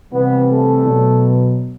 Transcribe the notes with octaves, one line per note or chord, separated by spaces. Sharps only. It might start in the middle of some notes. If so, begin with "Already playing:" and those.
C3 E3 G3 B3
A3
B2 F#3